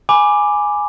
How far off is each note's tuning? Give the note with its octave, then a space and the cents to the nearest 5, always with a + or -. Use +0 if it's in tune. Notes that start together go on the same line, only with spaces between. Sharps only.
G#5 +0 B5 +0 D6 +0